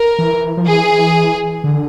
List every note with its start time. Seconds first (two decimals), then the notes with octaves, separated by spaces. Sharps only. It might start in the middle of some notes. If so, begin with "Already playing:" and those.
Already playing: A#4
0.19 E3
0.57 F3
0.67 E3 G#4
1.64 D3